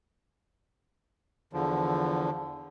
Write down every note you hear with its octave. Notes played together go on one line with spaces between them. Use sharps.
E2 D3 F3